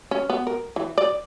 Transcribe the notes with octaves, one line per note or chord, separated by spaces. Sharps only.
C#4
B3
A#4
E3
D5